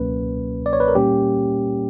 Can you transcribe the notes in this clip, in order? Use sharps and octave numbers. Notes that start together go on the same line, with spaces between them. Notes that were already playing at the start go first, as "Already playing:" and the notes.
Already playing: C#2 B2 F#3 A#3 C#4 B4
D5
C#5
B4
A#4
A#2 G3 A#3 C#4 G4